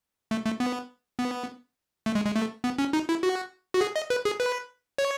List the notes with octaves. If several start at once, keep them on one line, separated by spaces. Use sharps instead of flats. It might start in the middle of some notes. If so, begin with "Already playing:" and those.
A3
A3
B3
B3
A3
G#3
G#3
A3
B3
C#4
D#4
E4
F#4
F#4
G#4
D#5
B4
G#4
B4
C#5